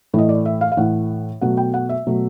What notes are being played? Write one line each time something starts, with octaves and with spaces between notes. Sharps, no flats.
A2 E3 A3 D#5
D5
E5
F5
F5
A2 E3 A3 F#5
B2 F#3 A3 F#5
G5
F#5
E5
B2 F#3 A3